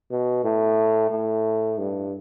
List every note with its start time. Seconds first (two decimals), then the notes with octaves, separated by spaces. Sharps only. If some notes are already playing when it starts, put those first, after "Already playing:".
0.11 B2
0.44 A2
1.11 A2
1.79 G2